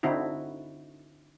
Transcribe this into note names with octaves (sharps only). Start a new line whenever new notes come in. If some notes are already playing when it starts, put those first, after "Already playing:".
D3 C4 D#4 E4 F#4